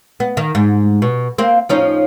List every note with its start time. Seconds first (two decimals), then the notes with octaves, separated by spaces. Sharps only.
0.20 B3
0.37 D#3
0.55 G#2
1.02 B2
1.38 A#3 C4
1.69 F3 C#4 D#4